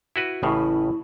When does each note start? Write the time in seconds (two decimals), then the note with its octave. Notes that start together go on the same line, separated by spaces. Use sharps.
0.16 E4 F#4 B4
0.43 A1 A2 C#3 E4